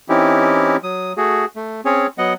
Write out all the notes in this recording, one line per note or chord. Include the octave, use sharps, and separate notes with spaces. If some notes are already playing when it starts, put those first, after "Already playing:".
E3 C4 C#4 D#4 E4 G4
F#3 D#6
A3 F#4 G#4
A3
C4 C#4 G#4 C#5
F#3 B3 D#5 F#5